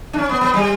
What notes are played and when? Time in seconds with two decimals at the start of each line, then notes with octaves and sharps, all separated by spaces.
0.13 D4
0.18 C#4
0.29 B3
0.41 B3
0.54 G3